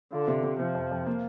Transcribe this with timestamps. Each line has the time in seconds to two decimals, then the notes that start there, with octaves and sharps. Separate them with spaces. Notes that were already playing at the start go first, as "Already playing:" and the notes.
0.12 D3 F4
0.28 C3
0.43 C3
0.59 C3 F3
0.75 F2
0.91 F2
1.06 A#3